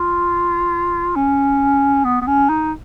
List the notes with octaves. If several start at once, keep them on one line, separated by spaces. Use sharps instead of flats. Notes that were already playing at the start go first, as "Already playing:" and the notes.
Already playing: F4
C#4
B3
B3
C#4
D#4